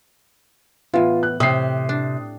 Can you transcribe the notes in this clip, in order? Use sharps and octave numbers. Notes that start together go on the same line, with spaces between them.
A2 E3 B3 F4
F#6
A2 C3 C4 D#6 C7
D4